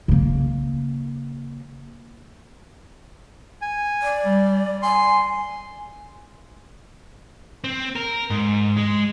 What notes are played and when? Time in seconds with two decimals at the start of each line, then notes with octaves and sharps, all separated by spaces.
0.08 C#3 A#3
3.62 G#5
4.02 D5
4.25 G3
4.82 G#5 C6
7.64 C4
7.96 A#4
8.30 G#2
8.77 G#3